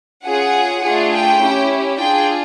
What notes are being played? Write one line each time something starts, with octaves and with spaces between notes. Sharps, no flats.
C#4 F4 G#4 F#5
A3 D4 F4 G#4
G5
C#4 E4 G4
D4 F4 G#4 G5